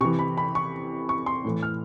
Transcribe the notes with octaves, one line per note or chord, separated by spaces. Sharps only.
C3 E3 C#6
B5
B5
C#6
C#6
C6
A2 E3
F6